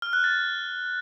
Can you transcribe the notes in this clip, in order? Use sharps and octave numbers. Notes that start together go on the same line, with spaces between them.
F6
F#6
A6